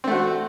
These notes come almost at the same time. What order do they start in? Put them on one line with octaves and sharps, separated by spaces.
C4 A3 F#4